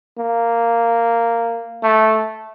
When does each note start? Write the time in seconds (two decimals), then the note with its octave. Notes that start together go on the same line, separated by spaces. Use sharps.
0.18 A#3
1.83 A3